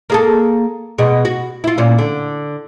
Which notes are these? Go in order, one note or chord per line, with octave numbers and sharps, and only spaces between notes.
A#3 G#4 A4
B2 G#3
F#4
E4 F4
A#2 C#4
D3